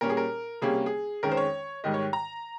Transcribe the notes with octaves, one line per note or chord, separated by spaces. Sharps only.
A#2 G3 C#4 A#4
G#4
A#4
C3 G3 A#3 C#4 G#4
G#4
F2 D#3 G#3 C#4 A#4
C5
C#5
G#2 D#3 G3 D#5
C#5
A#5